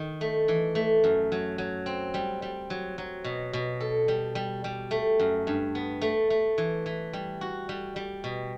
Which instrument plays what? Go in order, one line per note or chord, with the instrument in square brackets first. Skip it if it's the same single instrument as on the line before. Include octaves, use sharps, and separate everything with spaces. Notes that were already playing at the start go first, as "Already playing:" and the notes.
Already playing: [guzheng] D#3
A3
E3
A3
F#2
F#3
F#3
C4
G3
G3
F#3
F#3
B2
B2
A4
G3
G3
G3
A3
F#2
G2
B3
A3
A3
E3
E3
G3
F#4
G3
G3
B2